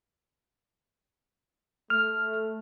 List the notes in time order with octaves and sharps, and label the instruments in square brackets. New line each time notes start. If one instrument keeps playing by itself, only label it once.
[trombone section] A3 [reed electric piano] F6